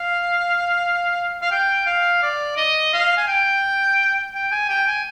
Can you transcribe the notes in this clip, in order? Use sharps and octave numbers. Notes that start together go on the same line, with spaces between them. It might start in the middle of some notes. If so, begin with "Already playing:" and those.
Already playing: F5
F5
G5
F5
D5
D#5
F5
G#5
G5
G5
G#5
G5
G#5